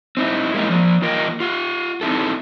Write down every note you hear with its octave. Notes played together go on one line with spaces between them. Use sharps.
C4 D#4 E4
G#3 A#3 C4 D#4 E4
F3 D5
E2 A#3 F4 A#4 D#5 G5
F4 F#5
C4 D#4 E4 A4